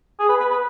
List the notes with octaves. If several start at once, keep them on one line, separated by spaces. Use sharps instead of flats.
G#4
B4
B4
B4